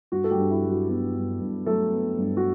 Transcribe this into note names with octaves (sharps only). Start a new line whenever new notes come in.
G2 F#4
A4
G3 G4
G2
E4
F#3
F#4
B3 F#4
G2
G2
F#3 A3 A4
B3
G2
F#4